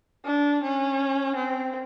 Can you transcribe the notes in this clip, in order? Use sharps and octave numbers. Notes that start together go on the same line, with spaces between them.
D4
C#4
C4